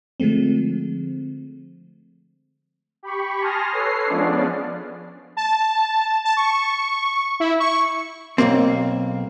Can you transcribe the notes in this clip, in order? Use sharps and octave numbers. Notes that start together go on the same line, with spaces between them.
D3 F3 G#3 A3 C4
G4 B5 C#6
G#5 A5 C6 D#6 F6 A#6
A4 B4 C#5 C7
F3 G#3 B3 C#4 D4 D5
A5
A5
C#6
E4
C#6
B1 F#2 A#3 C4